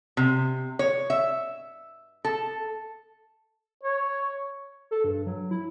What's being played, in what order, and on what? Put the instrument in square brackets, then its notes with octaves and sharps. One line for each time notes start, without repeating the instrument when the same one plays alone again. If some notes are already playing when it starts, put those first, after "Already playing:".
[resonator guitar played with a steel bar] C3
C#5
E5
A4
[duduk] C#5
[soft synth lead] A4
G2
F#3
E4